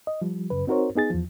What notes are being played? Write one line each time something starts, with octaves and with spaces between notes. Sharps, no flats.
D#5
F3 G3
F#2 C#3 B4
C4 D#4 F#4 A#4 C5 C#5
B3 D#4 G#4 A6
E2 F3